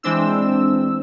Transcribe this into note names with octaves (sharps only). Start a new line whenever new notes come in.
E3 G#3 C4 D4 E6